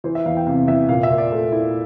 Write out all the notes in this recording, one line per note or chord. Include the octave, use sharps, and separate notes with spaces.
E3 C5
E5
E2 F5
G5
C3 F5
E2 E5
A#2 F5
E5
A#2
D5
A3
E4